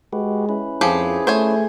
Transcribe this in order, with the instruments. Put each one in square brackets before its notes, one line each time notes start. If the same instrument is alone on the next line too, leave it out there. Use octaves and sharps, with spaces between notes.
[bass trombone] G#3 [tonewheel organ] F#4 G4 B4
[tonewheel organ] C#4 E4 B4
[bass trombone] F2 [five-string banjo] F3 G4 [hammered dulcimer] G#4
[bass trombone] A3 [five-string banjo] C5 C#5 G#5